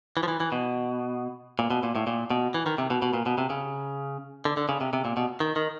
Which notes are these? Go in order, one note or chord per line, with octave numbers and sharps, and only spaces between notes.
E3
F3
E3
E3
B2
A#2
B2
A#2
A2
A#2
B2
E3
D#3
C3
B2
B2
A#2
B2
C3
C#3
D3
D3
C#3
C3
C3
A#2
B2
D#3
D#3